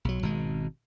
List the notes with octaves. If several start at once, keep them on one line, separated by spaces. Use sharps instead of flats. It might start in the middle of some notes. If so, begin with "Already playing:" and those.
B1 F#3
G#1 B2 G#3